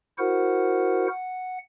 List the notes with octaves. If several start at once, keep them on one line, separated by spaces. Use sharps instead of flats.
E4 F#4 A#4 C5 F#5
F#5